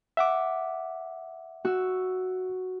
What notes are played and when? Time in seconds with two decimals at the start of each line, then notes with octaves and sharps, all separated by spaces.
0.17 E5 F#5 D6
1.65 F#4 E6